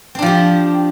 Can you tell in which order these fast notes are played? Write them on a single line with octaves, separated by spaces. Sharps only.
C4 D4 F3 G4